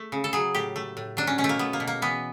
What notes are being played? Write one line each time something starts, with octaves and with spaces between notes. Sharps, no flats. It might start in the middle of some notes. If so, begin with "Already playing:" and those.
Already playing: A3
C#3
A4
F#3 G#4
A2 G4
A3
A2
F#3 D4
C#4
B2 C#4
A3
A#3
A3 B3
A#3
B2
A#3
E3 B3